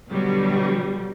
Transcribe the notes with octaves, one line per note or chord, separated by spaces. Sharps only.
B2 D3 F#3 G3